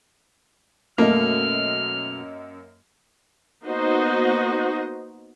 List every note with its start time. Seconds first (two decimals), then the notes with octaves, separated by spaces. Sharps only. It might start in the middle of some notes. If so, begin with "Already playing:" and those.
0.98 F#2 B2 A3 A#3 D#5 F6
3.65 A#3 B3 D#4 F#4 C5 D#5